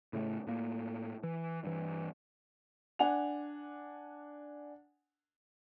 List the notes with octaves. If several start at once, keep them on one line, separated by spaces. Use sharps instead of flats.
A2 C#3 A3
A2 A#3
E3
G2 E3
D4 F#5 G#5 F7